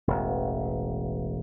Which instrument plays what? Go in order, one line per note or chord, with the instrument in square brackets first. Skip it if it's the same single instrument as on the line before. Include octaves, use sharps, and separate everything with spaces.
[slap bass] E1 A1